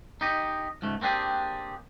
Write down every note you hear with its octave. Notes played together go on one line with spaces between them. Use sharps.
D#4 G4 D#5
C#2 G#2 A3
A#3 C4 D4 G4 G#4